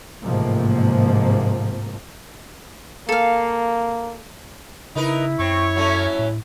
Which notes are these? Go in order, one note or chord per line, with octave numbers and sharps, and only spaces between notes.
A1 G#2 C3 F3 A#3
A#3 A4 F5
C#3 D#4 E4 A#4 B4
F#2 C4 C#5 C#6
F#3 A3 C#4
A2